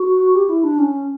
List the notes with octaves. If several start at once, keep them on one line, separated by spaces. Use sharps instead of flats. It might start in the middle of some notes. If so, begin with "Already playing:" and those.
Already playing: F#4
G4
E4
D4
C#4